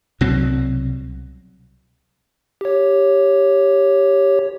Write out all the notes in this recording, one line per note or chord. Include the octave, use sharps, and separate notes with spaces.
C2 B2 F#3 C4
G4 C#5